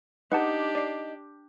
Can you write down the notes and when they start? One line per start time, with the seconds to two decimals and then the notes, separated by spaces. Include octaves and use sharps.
0.32 D4 D#4 G4 B4 F#5 A5
0.75 D5 C7